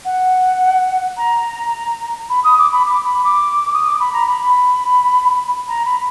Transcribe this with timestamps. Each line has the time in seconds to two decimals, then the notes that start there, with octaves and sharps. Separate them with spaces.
0.05 F#5
1.17 A#5
2.29 B5
2.44 D#6
2.58 D6
2.72 B5
2.86 D6
3.04 B5
3.24 D6
3.73 D#6
3.86 D6
4.00 B5
4.13 A#5
4.27 B5
4.41 B5
5.68 A#5
5.85 B5